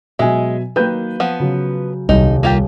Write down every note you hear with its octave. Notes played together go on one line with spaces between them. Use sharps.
B2 F#3 G#3 E5 G#5
D#3 F#3 A#3 B4 G6
F3 B3
C#3 F#3
D#1 C2 G3 D#4
A#3 F4 G4